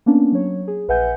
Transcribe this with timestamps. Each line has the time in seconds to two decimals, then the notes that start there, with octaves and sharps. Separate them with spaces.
0.06 A#3 B3 C#4 D4
0.32 F#3 C#5
0.67 G#4
0.88 A#1 B4 E5 F#5 G#5 G6